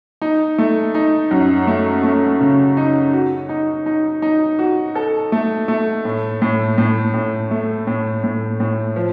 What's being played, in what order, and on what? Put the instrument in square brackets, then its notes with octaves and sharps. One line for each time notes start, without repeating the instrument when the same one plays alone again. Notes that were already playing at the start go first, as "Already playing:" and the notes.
[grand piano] D#4
A3
D#4
F#2
A3
A3
C#3
D#4
F#4
D#4
D#4
D#4
F#4
A4
A3
A3
A2
A2
A2
A2
A3
A2
A2
A2
F3